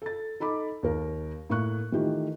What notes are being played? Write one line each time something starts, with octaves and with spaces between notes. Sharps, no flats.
A4 A6
D#4 A4 B5 D6
D#2 A#4
A2 A#3 C#6 F#6
D#3 E3 A3 F4 G4